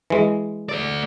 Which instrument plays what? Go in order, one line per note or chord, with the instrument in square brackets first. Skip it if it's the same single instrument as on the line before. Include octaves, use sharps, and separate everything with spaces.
[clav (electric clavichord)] E3 G#3
[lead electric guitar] A3 D5